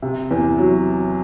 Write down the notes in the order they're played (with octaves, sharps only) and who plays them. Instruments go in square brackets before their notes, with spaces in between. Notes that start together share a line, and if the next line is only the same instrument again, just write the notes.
[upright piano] C3
E2
F#3